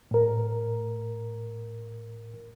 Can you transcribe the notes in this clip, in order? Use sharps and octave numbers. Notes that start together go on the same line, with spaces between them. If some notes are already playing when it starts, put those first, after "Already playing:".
A2 A#4